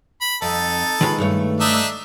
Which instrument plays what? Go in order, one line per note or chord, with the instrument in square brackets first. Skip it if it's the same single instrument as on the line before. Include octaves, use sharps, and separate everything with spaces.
[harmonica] B5
[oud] F2 [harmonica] D#4 A4
[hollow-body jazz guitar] D#3 G#3 B5 [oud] F4 B4
[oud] G2 A3 C#5
[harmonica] D4 D#4 E5